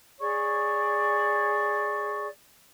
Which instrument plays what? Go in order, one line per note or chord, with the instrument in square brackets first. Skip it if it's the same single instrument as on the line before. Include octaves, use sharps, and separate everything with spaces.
[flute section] G#4 C#5 D5 C#6